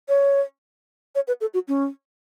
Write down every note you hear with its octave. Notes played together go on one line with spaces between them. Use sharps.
C#5
C#5
B4
A4
F#4
C#4